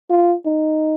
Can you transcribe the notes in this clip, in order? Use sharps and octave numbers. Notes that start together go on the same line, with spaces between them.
F4
D#4